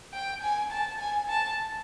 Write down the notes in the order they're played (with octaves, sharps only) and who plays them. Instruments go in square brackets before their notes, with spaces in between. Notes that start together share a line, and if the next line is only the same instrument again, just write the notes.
[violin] G5
G#5
A5
G#5
A5